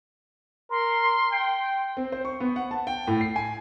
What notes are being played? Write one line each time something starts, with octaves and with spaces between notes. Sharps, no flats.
A#4 C6
G5
C4
C5
C#6
B3
F#5
A5
G5
A2
C7
G#5